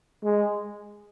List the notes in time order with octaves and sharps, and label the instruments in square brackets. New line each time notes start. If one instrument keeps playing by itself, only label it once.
[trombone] G#3